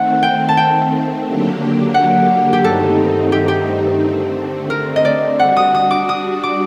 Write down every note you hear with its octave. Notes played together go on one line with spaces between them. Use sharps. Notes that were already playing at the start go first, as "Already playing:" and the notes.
Already playing: D#3 A3 C4 F#5
G5
A5
G5
D3 F#3 A#3 D4 G4
F#5
G4
G2 D#3 A3 C4 D#4 A4
G4
G4
D3 A3 C4
A#4
D#5
D5
G3 D4 F#4 F#5
D#6
D#6
D6
D#6
D6